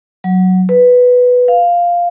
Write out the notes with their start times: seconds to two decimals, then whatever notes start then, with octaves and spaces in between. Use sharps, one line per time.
0.24 F#3
0.69 B4
1.48 F5